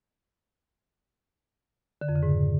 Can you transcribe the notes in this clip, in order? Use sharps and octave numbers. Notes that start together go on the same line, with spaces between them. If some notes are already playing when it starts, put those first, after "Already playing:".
D3
F2
C#3
G#2